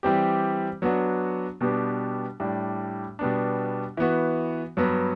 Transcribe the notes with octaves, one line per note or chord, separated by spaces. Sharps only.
E3 G3 C4 G4
F#3 B3 D4 F#4
B2 G3 B3 D4 G4
A2 G3 D4
B2 G3 B3 D4
E3 B3 F#4
G2 F#3 B3